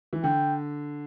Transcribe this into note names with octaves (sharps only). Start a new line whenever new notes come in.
E3
D3 G5